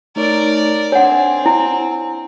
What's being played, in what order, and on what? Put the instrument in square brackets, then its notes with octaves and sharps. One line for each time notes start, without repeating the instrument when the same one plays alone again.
[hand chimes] A3 D#4 C#5 [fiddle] A#4 D5
[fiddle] C4 [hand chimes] D4 G#5 [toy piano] C#5 F#5
[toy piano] E4